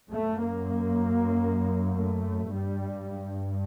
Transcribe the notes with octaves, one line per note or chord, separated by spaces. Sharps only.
F#2 A3
A#3
A3
G2 G3